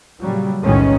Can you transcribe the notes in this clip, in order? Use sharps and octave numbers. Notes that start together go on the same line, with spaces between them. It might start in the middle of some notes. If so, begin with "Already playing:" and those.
A#2 C#3 F#3 G3
B1 E2 A2 D#3 G#3 C#4